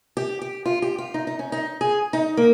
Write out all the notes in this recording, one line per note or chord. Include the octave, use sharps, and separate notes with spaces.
G4
G4
F4
G4
F4
D#4
D#4
C#4
D#4
G#4
D#4
A#3